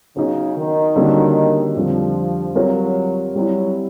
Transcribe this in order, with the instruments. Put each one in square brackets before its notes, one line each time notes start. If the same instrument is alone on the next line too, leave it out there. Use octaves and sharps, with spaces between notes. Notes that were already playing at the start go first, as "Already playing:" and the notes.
[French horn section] C#3 [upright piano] F#3 B3 D#4
[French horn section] D#3
[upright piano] D3 G3 A#3 C#4 F#4
[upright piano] F2 D3 G3 [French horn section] F3
[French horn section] F#3 [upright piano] G3 C4 F4 A#4 C#5
[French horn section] F#3 [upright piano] G3 C4 E4